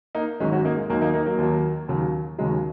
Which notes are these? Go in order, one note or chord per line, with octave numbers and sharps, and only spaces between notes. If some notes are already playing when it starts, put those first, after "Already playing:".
A#3 D#4
G#1 G#2 F#3 G#3 C#4
C#4 F#4
A#3 D#4
G#3
D#2 D#3 F#3 A#3
A#3 D#4
A#3 D#4
F#3 A#3
D#2 D#3 F#3
D#2 C#3 F#3
D#2 C#3 F#3 G#3